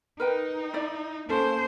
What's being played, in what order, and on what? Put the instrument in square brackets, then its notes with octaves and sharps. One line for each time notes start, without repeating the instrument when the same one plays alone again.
[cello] D#4 [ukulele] A#4 B4 G5
[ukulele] E4 D5
[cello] A#3 C5 [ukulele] C#4 A4